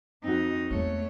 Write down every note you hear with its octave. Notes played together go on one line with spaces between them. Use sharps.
F2 C4 D#4 F#4
E2 G#3 A3 C#5